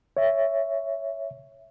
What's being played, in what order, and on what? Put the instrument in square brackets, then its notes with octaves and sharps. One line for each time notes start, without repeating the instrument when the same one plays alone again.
[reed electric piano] C#5 E5